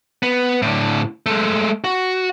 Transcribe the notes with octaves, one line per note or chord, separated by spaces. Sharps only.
B3
A2 D3
G#3 A3
F#4